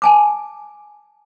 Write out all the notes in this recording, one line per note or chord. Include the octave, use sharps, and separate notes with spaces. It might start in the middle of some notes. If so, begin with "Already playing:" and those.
G#5 A5 D6